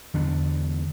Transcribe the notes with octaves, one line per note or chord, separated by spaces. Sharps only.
E2 D3 B3 D4